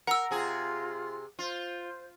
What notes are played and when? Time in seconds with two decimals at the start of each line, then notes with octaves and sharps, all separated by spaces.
0.07 A#4 F#5 E6
0.31 C3 F4 G#4
1.39 F4 C5